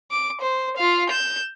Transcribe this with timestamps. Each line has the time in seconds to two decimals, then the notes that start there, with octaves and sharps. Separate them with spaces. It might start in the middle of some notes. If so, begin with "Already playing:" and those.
0.11 D6
0.41 C5
0.77 F4 F5
1.10 G6 E7